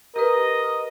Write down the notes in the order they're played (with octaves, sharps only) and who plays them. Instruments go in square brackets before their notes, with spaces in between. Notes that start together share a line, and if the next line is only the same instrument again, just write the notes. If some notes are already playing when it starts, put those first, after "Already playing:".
[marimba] G4 B4 [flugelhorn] A#4 [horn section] D#5